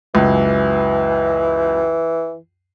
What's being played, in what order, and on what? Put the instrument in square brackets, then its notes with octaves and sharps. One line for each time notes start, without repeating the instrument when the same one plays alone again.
[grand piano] C#2 F#2 [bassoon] E3